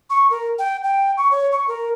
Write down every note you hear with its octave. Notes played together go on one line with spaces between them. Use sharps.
C#6
A#4
G5
G5
C#6
C#5
C#6
A#4